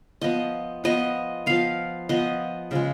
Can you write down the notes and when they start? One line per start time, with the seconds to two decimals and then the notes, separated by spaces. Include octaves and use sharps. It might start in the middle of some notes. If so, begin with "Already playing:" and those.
0.22 F3 B3 D#5
0.84 F3 B3 D#5
1.46 F3 B3 F5
2.09 F3 B3 D#5
2.71 C#3 F3 G#3